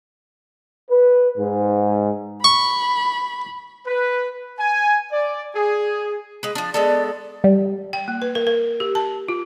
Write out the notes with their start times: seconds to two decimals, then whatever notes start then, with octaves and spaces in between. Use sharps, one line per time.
0.90 B4
1.38 G#2
2.44 B5 C#6
3.87 B4
4.59 G#5
5.12 D5
5.56 G#4
6.43 G#3 B4
6.55 F3 D4
6.74 G#3 B3 A4 D5
7.44 G3
7.93 G5
8.08 A#3
8.22 B4
8.35 A#4
8.47 A#4
8.80 G4
8.95 A5
9.28 F4